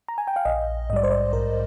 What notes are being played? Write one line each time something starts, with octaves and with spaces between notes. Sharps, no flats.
A#5
G#5
G5
F5
A#1 D#5
G#2 G3 D5 D#5
C5
D5
A#1 A#4